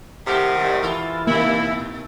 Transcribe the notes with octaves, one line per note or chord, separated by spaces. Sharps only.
A2 C3 D#3 G4 A4 F#5
G3 A3
E3 F4 A4
B2 D#3 A#3 E4